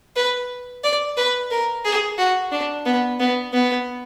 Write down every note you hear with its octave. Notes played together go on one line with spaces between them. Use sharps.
B4
D5
B4
A#4
G#4
F#4
D4
B3
B3
B3